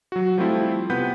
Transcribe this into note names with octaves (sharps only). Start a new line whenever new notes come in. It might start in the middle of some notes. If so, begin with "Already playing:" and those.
F#3 F#4
F3 G3 A3 C4 E4 F4
C3 B3 B4 F#5 B5 G6